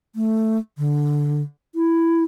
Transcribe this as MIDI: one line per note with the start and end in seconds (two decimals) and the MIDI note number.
0.16 0.58 57
0.78 1.42 50
1.75 2.23 64